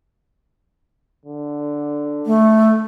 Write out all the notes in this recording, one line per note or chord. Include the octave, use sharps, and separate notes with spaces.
D3
A3